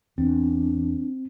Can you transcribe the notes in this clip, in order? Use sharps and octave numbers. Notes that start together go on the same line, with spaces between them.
E2 C4 D4